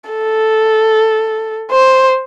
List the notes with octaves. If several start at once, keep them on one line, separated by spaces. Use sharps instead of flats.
A4
C5